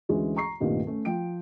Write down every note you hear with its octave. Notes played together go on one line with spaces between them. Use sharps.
D2 E3 G#3 C#4
A#5 C#6 C7
C2 G2 A#2 D#3 G3 A3
A3 C#4
F3 G5 D7